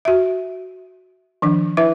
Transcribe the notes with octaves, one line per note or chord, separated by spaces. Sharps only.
F#4 E5
D#3 F3 D4
E4 B4 E5